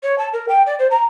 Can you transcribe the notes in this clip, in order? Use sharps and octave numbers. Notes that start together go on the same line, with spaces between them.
C#5
A5
A#4
G5
D5
C5
A#5